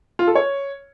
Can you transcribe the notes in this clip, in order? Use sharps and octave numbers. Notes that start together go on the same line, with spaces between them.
F4
A4
C#5